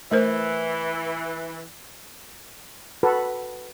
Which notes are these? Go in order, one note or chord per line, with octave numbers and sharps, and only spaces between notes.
E3 A3 A#4 C5
F#4 A4 B4